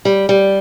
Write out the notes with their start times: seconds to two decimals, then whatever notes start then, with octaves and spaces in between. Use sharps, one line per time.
0.05 G3
0.29 G3